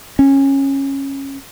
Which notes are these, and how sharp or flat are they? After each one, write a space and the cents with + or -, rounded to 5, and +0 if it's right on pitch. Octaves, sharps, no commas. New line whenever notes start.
C#4 -15